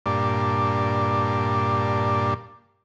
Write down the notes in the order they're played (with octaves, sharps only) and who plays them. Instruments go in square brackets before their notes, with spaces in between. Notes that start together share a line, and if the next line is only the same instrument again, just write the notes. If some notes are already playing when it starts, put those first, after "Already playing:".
[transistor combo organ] G2 A#2 D4